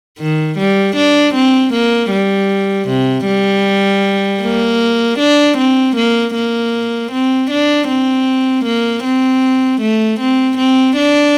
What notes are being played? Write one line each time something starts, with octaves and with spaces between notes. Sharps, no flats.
D#3
G3
D4
C4
A#3
G3
C3
G3
A#3
D4
C4
A#3
A#3
C4
D4
C4
A#3
C4
A3
C4
C4
D4